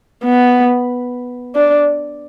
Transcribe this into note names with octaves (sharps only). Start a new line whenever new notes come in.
B3
D4